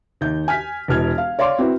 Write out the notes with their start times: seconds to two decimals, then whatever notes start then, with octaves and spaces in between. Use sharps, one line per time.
0.21 D#2 G6
0.48 G#5 F6 B6
0.88 E1 E3 F6 G#6
1.18 F5
1.39 C#5 D5 F5 C6 D6
1.58 C4 E4 F#4 B4